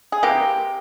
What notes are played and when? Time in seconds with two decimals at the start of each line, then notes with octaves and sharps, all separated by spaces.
0.12 G#4
0.23 C3 E3 A#3 G4